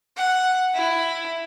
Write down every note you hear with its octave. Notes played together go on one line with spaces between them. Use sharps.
F#5
E4